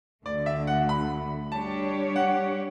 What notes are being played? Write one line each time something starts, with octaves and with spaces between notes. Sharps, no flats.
D2 D3 A3 D5
E5
F#5
B5
G3 D4 G4 C#5 A5
F#5